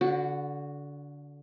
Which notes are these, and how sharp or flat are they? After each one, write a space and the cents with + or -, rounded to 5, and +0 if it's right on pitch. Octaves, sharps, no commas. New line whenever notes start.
D3 -25 F#4 +0